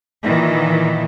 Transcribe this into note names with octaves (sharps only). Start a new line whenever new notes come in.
A#2 D#3 E3